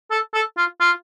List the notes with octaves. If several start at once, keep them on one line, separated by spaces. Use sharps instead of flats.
A4
A4
F4
F4